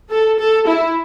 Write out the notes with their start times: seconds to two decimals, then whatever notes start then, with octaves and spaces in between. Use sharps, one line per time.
0.10 A4
0.39 A4
0.67 E4